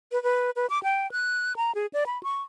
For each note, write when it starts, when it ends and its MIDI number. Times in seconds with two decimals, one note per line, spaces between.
0.12 0.21 71
0.23 0.51 71
0.56 0.66 71
0.70 0.82 86
0.83 1.10 79
1.12 1.56 90
1.56 1.74 82
1.75 1.86 68
1.93 2.04 74
2.06 2.21 83
2.23 2.42 85